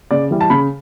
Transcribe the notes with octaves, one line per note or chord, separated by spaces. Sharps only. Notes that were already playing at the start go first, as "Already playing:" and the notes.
C#3 D5
E3 G3
A5
C#3 B5